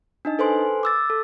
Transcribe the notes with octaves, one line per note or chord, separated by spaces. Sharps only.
D4 D#4 D#5
A4 B4 C5 G#5 C6
D6 E6 A6
A4